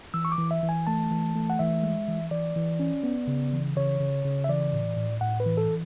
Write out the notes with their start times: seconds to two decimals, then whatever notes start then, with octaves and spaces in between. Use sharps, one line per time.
0.14 E3 E6
0.25 C#6
0.32 D6
0.38 E3
0.51 E5
0.63 E3
0.69 G#5
0.87 A3 A5
1.11 E3
1.35 A3
1.50 F#5
1.59 E3 E5
1.83 G#3
2.08 E3
2.31 E3 D5
2.56 E3
2.80 C#4
3.04 B3
3.28 C#3
3.53 E3
3.77 C#3 C#5
4.00 C#3
4.25 C#3
4.44 E5
4.49 E3 D5
4.73 A2
4.97 A2
5.21 A2 F#5
5.40 B4
5.46 E3
5.57 A4